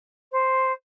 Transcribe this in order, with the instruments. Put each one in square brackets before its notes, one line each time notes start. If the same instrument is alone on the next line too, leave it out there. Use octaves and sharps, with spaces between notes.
[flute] C5